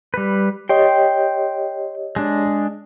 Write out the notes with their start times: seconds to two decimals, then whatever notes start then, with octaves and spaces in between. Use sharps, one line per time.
0.14 G3 B4
0.69 G4 C#5 D#5 G5 C6
2.16 G#3 D4